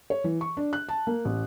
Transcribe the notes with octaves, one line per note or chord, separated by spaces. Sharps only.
C#5
E3
C#6
D4
F#6
A5
A#3
A1